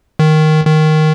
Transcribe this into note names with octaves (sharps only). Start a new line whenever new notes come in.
D#3
D#3